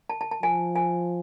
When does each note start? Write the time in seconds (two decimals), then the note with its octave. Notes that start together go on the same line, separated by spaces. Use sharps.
0.10 A5
0.21 A5
0.31 A5
0.43 F3 G#5
0.76 G#5